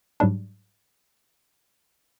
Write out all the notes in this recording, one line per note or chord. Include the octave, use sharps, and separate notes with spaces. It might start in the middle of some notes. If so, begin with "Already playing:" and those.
G#2 F#3 G3 D4